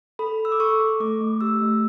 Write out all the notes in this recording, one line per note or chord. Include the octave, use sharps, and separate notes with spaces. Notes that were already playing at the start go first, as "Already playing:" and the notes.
A4 B5
A4
E6
D6
A4 C#6
A4
A3 D6
A3
G4 E6
A3